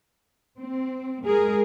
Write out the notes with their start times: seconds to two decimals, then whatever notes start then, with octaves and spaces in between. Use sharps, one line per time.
0.59 C4
1.25 G#3 G#4 A#4